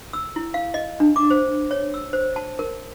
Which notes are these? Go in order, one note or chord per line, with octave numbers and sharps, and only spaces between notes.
E6
E4
F5
D#5
D4
D6
C5
C#5
E6
C5
A5
A#4